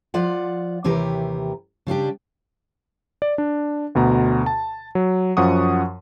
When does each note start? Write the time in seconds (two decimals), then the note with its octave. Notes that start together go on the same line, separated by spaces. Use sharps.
0.14 F3 F4 D5 F#5
0.84 D#2 C3 E3 G4 A#4 B4
1.87 C#3 G3 D4 G4
3.22 D5
3.38 D4
3.95 D2 B2 A#5
4.46 A5
4.95 F#3
5.37 F#2 F3 F#5 C#6 D#6